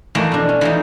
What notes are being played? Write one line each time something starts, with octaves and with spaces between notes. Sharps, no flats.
F2 E3 A3 A#3 D#4
B2 D4
C#4
E3 F3 D#4